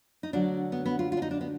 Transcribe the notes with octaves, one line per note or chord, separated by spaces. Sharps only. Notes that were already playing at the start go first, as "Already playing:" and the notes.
D#4
D2 D3 F#3 D4
B3
B3
F4
F4
D4
D#4
D4
B3